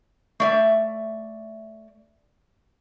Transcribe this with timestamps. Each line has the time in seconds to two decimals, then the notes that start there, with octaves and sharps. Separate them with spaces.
0.40 A3 D5 E5